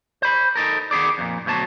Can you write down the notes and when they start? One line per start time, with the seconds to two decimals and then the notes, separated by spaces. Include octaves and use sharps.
0.22 C5 B5
0.56 D#4 A4 A#4
0.91 D#3 B3 G#4 D5
1.18 F2 A#2
1.46 D2 B2 F#3 A5